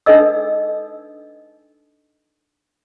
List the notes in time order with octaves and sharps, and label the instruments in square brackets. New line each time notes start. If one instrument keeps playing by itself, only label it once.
[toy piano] D4 D#4 A4 B4 D#5 E6